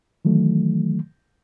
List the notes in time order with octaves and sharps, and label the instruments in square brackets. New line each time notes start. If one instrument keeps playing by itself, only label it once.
[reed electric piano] D#3 E3 F#3 A3